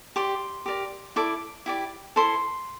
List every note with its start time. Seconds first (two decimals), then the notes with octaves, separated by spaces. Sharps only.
0.16 G4 D5 C6
0.66 G4 A#4 D5
1.16 E4 A4 D5 D6
1.66 E4 G4 D5
2.16 E4 A4 C5 C6